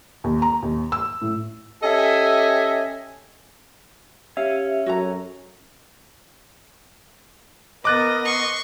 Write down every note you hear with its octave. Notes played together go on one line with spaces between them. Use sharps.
D#2
A#5
D#2
E6
A2
C#4 G4 A4 D#5 E5 G#5
C#4 G4 E5 F5
F#2 F#4 A4 A#5
B3 A#4 D#5 D6 F#6 A6
C6 C#6